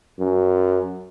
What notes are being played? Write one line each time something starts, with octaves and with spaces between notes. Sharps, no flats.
F#2